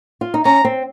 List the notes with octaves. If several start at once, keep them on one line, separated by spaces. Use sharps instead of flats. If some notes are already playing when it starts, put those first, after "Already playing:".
F4
D#4
C#4 A#5
C4